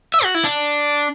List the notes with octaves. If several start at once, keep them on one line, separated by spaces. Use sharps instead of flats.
E5
F#4
E4
D4